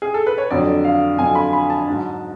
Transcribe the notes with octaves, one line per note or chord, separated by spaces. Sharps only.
G#4
A4
B4
C#5
F2 D3 F#3 D5
F5
F2 D3 F#3 G#5
B5
B5
A5
G#2 F#3